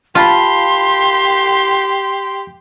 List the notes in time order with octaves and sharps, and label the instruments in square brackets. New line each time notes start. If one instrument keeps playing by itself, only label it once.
[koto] F4 [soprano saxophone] G4 [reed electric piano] F5 A5 B5 [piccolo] C6